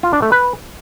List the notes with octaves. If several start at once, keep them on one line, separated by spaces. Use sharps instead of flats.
F4
D4
A3
B4